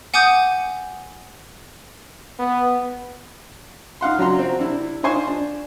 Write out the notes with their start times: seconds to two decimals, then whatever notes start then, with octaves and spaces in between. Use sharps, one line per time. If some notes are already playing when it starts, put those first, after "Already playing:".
0.14 F#5 G#5 D6 D#6 G6
2.40 B3
4.01 D#4 F5 F#5 C6
4.18 C#3 F#3 D4 F#4 A#5 C6
4.38 C4 F#4
4.59 C3 D4 E4
5.03 D4 D#4 F4 C5 G#5 C#6
5.28 D4